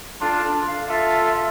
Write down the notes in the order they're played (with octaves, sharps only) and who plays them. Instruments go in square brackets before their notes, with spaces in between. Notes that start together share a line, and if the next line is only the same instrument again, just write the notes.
[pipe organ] D4 F4 [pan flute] A4
[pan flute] A4
F5
[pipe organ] F4 A4 [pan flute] E5